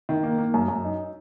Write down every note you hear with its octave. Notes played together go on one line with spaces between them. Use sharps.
D#3
A#3
A#3
F#2
F#2
D#4